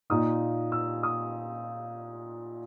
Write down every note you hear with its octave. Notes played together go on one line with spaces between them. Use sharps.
A#2 A#3 D#4 D#6
E6
D#6